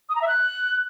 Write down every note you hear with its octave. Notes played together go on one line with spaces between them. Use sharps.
D#6
A#5
E5
F#6